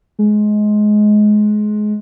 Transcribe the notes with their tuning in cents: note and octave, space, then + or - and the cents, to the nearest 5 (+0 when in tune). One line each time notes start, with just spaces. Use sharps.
G#3 +20